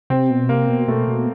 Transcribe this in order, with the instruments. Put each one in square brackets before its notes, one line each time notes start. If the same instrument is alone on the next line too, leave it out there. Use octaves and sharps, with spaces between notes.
[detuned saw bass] C3 [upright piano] C4
[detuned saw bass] B2
[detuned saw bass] C3 [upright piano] A#3
[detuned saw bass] B2
[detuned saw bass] B2 [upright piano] A3
[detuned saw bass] B2